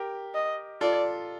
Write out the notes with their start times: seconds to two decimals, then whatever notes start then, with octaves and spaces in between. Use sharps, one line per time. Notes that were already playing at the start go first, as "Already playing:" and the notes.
Already playing: G4 A#4
0.34 D#5
0.81 F4 A4 D5